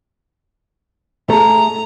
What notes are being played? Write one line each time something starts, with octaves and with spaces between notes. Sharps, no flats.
A3 G#4 A#5